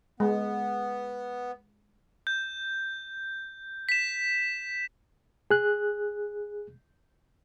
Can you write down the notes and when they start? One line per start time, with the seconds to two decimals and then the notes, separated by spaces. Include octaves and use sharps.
0.20 G#3 B3
2.27 G6
3.89 B6 E7
5.51 G#4 F#6